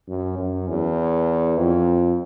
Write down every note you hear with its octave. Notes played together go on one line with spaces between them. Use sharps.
F#2
F#2
E2
F2